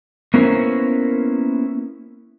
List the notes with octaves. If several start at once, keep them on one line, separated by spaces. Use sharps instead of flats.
A#3 B3 C#4 E4 A#4 C5